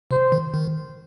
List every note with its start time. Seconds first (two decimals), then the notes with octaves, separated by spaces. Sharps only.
0.11 C3 C5
0.32 D#3
0.54 D#3